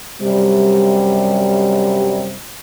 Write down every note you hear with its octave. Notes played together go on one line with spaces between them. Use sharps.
F#2 C3 G3